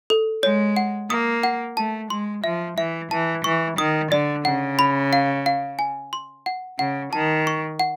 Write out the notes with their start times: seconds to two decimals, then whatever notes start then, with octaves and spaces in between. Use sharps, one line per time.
0.10 A4
0.43 G#3 C#5
0.77 F#5
1.10 A#3 D#6
1.43 F#5
1.77 A3 A5
2.10 G#3 C6
2.44 F3 E5
2.78 E3 E5
3.11 E3 A5
3.44 E3 C#6
3.78 D#3 D#6
4.12 D3 D5
4.45 C#3 F#5
4.79 B5
5.13 F5
5.46 F5
5.79 G#5
6.13 C6
6.46 F#5
6.79 C#3 F#5
7.13 D#3 A5
7.47 C#6
7.79 F#5